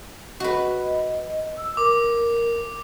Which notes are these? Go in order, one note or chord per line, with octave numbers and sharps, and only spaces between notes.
F#4 B4 D#5
E6
A#4 D6